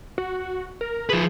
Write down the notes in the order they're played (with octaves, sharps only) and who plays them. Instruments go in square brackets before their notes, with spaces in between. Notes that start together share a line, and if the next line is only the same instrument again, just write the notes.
[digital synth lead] F#4
A#4
[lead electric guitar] F3 B4 [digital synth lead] G#4